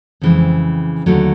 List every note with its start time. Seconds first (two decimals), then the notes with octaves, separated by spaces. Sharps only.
0.21 F2 C#3 E3 G#3 C4
1.06 D#2 D3 F#3 A3